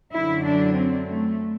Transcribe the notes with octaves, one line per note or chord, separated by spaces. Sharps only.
F#2 D3 F#3 E4
D4
C4
A3